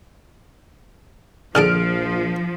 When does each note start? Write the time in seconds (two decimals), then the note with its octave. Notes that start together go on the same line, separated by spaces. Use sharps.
1.55 A#1 D3 F3 G#4 A4 F6 D7